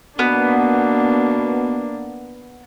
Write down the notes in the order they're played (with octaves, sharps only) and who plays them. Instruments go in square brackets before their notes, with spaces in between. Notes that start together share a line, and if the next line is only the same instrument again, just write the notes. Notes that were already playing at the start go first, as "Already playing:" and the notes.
[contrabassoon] B2 [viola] A#3 D4 [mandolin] B3